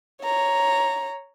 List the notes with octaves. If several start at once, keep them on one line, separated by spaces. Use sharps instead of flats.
C#5 A#5